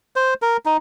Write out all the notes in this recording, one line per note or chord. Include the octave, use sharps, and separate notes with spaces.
C5
A#4
D#4